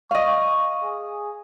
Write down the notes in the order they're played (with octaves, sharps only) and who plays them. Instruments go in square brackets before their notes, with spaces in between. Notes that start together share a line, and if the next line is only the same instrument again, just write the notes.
[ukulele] D#5 F5 [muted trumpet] C#6
[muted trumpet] G#4